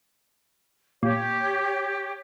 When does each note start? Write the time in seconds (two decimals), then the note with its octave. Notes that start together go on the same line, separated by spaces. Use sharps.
1.03 A#2 G4 C#5